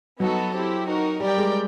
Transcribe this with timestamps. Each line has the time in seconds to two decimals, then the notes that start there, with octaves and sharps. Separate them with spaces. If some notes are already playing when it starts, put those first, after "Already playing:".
0.20 F#3 B3 D#4 F#4 A4
0.54 C4 E4 G4
0.88 D#4 F#4 A#4
1.20 G3 G4 A#4 D5 G5
1.38 G#3